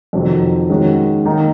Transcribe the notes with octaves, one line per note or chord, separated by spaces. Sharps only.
F2 C3 D#3 F#3
D#3 G#3 C#4 F#4
D#3 A#3 D#4